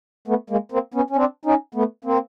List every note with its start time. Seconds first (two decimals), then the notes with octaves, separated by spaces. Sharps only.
0.28 A3 B3
0.50 G#3 A#3
0.72 A#3 C4
0.94 B3 C#4
1.10 C#4
1.16 C4 D4
1.45 C#4 D#4
1.75 A3 B3
2.04 A#3 C4